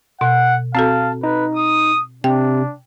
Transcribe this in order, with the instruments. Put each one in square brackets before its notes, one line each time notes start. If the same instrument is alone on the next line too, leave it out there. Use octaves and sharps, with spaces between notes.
[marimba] B2 [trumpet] F#5
[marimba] C4 F#4 A4 [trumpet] F5 [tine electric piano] A5
[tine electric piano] D#4 [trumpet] B4
[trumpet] D#6
[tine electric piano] C3 [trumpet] D4 [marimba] G5